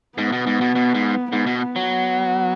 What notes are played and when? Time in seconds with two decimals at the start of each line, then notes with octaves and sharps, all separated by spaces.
0.18 G#2 B3
0.32 B2
0.47 G#2
0.61 B2
0.75 B2
0.94 G#2
1.32 G#2 B3
1.46 B2
1.62 B3
1.76 F#3
1.89 B3